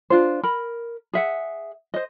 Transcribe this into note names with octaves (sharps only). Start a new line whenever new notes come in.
D4 F4 C5
A#4 B5
G#4 E5 F#5
C5 D#5